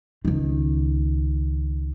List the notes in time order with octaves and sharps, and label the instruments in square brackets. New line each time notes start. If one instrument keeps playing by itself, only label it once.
[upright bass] C#2 D#3